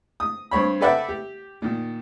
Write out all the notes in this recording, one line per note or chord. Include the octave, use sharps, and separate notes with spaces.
D#6
G2 C4 C#5 B5
A4 B4 D5 E5 F#5 G5
G4
A#2 D#3